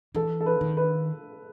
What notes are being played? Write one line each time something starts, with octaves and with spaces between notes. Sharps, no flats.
E3 A4
A4
B4
D#3
B4